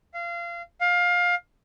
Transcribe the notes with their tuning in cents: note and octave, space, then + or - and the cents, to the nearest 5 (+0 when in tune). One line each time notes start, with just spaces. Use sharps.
F5 -25
F5 +20